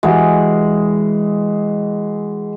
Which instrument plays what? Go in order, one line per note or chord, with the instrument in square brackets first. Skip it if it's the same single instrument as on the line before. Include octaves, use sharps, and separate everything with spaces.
[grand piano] E3 E4 F#4 [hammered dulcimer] G#3